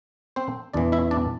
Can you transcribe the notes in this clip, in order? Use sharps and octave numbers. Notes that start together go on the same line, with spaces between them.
C4 C5
E2 E3 D4 D5
E4 E5
D4 D5